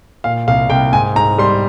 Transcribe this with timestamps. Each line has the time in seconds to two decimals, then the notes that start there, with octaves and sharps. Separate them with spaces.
0.24 A#2 F5
0.48 C2 F5
0.70 C2 G5
0.92 G#2 G#5
1.16 G#2 A#5
1.38 G3 C6